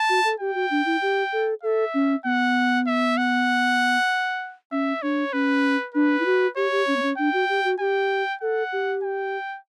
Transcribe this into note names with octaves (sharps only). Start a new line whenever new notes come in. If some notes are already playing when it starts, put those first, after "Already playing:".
Already playing: A5
F#4
A4
G4 G5
F#4
D4
E4
G4
A4
A4 E5
C#4
B3 F#5
E5
F#5
C#4 E5
D4 C#5
C#4 B4
D4 B4
E4
F#4
G4 C#5
G4
C#4
B3
C#4
D4 G5
F#4
G4
F#4
G4 G5
A4 F#5
G4
G5